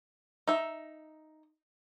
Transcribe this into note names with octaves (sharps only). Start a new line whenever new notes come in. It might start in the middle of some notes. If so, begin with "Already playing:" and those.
D#4 E5